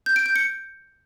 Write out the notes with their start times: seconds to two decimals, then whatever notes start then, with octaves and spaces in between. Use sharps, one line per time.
0.06 G6
0.16 D7
0.26 G6
0.36 C#7